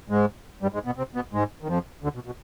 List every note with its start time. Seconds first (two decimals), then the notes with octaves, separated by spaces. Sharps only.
0.10 G#2 G#3
0.62 G2 G3
0.74 G#2 G#3
0.86 B2 B3
0.98 C3 C4
1.15 B2 B3
1.33 G#2 G#3
1.63 D#3
1.68 F2 F3
2.03 D2 D3
2.15 B2
2.26 B2